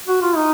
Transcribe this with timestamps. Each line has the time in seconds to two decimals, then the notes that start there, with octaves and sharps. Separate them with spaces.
0.07 F#4
0.22 F4
0.36 D#4